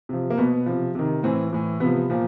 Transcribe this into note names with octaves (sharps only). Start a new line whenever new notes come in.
C3 F3
A#3
B2 B3
C3 F3
C3 D#3
A2 E3 C4
A2 E3
C3 F3 B3
A#2 F3